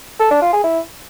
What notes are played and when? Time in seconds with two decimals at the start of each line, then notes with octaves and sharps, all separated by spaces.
0.20 A4
0.31 D4
0.42 F4
0.53 G#4
0.64 E4